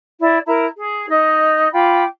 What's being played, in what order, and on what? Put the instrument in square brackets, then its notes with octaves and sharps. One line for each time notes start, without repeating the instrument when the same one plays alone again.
[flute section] E4 D5
E4 A#4 A#5
G#4
D#4 D#5
F4 G5 B5 D6